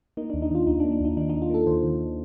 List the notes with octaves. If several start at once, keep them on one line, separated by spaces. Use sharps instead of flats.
A#3 D#4
D#2 D4
D#4
D#3 F4
D#2 D#4
D4
A#3
D4
D#2 D#4
D#3 D4
D#2 D#4
F4
A#3 A4
D#2 C5
D#3